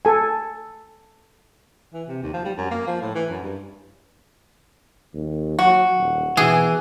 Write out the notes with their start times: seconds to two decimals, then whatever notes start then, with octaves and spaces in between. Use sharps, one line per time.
0.05 A4 G#5
1.94 E3
2.08 C3
2.22 D#2
2.34 F3
2.45 G3
2.57 F#2
2.71 A#3
2.87 F3
3.02 A2
3.15 E3
3.30 F#2
3.43 G2
5.14 D#2
5.59 F#3 F#4
5.98 D#1
6.37 B2 E3 G#4